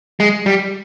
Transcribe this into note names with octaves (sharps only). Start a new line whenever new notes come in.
G#3
G3